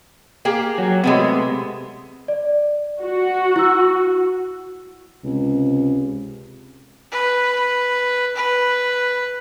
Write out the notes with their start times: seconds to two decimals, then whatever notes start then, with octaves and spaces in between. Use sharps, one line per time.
0.45 A#3 G4 G#4
0.78 F#3
1.04 C3 G#3 A3 B3
2.28 D5
3.03 F#4
3.56 E4 E6
5.24 C#2 C3
7.12 B4
8.36 B4